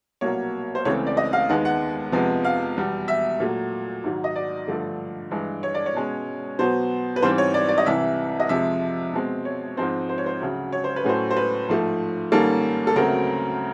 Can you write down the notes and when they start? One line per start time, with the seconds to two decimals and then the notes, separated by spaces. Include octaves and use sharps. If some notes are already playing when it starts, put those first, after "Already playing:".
0.21 C2 B2 F#3 A#3 C#5
0.75 C5
0.85 C#2 C#3 E3 A3 C4 C#5
1.07 D5
1.17 D#5
1.33 F5
1.49 D#2 D#3 G#3 B3 F#5
1.65 F#5
2.12 F2 C3 F3 G#3 B3
2.44 F5
2.77 E2 B2 G3
3.08 E5
3.40 A#2 F#3 A3
4.04 G#2 D#3 F#3
4.24 D#5
4.36 D5
4.68 G2 D3 F3 A3
5.31 G2 E3 G#3
5.63 C#5
5.75 D5
5.86 C#5
5.95 B2 G#3 C#4
6.59 B2 F#3 B3 C5
7.16 B4
7.22 G#2 E3 G3 C4 C5
7.38 C#5
7.54 D5
7.69 D5
7.78 D#5
7.86 C2 C3 E3 E5
8.40 D#5
8.49 F2 C3 F3 G#3 E5
9.13 B2 G#3 C4
9.45 C#5
9.77 G#2 F3 G#3 C4 C5
10.09 C5
10.18 C#5
10.26 C5
10.41 D2 C#3 F#3
10.73 C#5
10.84 C5
10.96 B4
11.04 A2 F#3 A3 C#4 C5
11.31 C5
11.37 B4
11.68 G#2 F3 A3
12.32 G#2 D#3 G3 A#3 C#4 A4
12.87 A4
12.96 D2 C#3 F#3 A3 C4 A#4